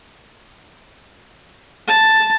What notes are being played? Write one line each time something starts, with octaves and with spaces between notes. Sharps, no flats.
A5